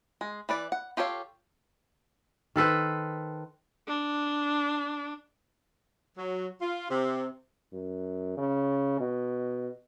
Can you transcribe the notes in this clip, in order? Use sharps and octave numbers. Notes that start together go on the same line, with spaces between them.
G#3
E3 B4 D5
F#5
F4 G4 A4 C#5 F5
D#3 A4 B4 C5
D4
F#3
F4
C3
F#2
C#3
B2